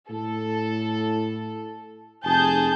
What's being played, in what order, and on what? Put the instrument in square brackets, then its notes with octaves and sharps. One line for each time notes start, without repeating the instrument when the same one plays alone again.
[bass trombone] A2 [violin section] A4
[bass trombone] F1 [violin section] G#4 A5 G6